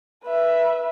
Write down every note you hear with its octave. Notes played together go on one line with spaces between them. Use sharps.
B4 E5